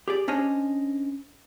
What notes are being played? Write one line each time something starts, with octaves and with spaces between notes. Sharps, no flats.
G4 G#4 D5
C#4 D4 C5 C#5 D#5